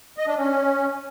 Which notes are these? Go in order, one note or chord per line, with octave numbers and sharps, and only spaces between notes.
D#5
D4
C#4